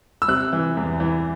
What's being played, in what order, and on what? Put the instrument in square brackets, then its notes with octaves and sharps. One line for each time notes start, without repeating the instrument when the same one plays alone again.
[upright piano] E6
C3 F#6
E3
E2
E3